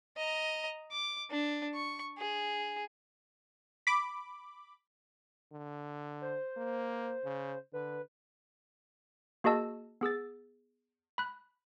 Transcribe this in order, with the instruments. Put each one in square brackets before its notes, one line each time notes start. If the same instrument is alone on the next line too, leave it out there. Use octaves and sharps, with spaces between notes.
[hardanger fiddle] D#5 A#5
D6
D4
C#6
G#4
[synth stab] B5 D6
[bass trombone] D3
[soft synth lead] C5
[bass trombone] A#3
C#3
[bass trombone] D3 [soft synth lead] B4
[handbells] A#3 F#4 G#4 D#5 A5 E6
B3 G#4 E6 A6
B5 F#6